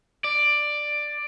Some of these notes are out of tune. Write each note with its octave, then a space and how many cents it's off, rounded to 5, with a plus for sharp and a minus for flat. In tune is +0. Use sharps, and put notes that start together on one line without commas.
D5 +10